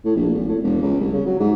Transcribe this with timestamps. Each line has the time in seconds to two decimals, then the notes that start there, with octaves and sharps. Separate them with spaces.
0.05 A2
0.16 A#1
0.33 G#1
0.48 A2
0.63 E1
0.82 C#2
1.00 C2
1.13 C#3
1.26 F#3
1.40 G#2